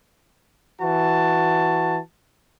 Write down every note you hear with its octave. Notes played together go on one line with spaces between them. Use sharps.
E3 F#4 A5